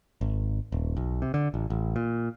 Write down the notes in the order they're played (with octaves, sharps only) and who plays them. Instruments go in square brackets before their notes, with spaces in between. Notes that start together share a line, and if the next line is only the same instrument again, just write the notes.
[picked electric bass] G#1
D#1
B1
C3
D3
A1
A1
A#2